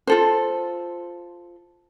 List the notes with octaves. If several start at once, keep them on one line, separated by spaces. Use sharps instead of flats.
F4 A4 C5